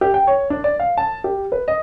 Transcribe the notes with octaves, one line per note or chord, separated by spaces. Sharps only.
G4
G5
C#5
D4
D5
F5
A5
G4
B4
D#5